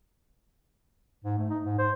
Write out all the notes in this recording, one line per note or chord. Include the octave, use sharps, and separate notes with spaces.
G#2
A3
D#4
G#2
C5